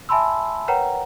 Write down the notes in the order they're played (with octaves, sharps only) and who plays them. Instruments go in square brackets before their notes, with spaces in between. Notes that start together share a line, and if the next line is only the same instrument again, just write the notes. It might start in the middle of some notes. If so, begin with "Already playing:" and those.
[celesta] E5 G#5 A5 B5 C6 E6
A#4 B4 C#5 F#5 G5 A#5